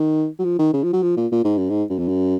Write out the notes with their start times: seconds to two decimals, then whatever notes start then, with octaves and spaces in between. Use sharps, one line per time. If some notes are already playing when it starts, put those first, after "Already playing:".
Already playing: D#3
0.39 F#3
0.45 F3
0.59 D#3
0.73 C#3
0.83 F3
0.93 F#3
1.03 F3
1.17 A#2
1.32 A#2
1.44 G#2
1.58 F#2
1.70 G#2
1.90 F#2
1.99 F2
2.08 F#2